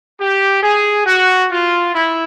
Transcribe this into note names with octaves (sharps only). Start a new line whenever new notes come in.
G4
G#4
F#4
F4
E4